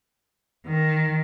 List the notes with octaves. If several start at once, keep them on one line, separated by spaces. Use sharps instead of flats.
D#3